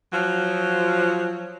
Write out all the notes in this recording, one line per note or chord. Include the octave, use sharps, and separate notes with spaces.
F3 F#3